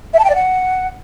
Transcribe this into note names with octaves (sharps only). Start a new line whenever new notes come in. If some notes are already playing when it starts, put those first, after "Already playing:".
E5
A5
G5
D5
F#5